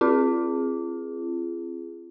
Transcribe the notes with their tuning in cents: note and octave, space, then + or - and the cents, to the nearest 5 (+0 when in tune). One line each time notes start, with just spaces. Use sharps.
C4 +15 F4 -40 G#4 +0